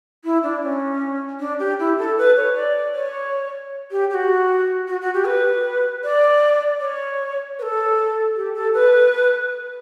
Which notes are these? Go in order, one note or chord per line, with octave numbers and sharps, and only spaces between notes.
E4
D4
C#4
D4
G4
E4
A4
B4
C#5
D5
C#5
G4
G4
F#4
F#4
F#4
G4
B4
D5
C#5
B4
A4
G4
A4
B4